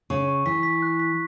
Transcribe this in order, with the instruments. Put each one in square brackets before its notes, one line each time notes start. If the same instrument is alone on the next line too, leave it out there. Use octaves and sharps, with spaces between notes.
[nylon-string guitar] C#3 [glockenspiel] C#6
[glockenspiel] C#6
[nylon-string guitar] E3 [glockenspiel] B6
[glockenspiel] B6
F#6
B6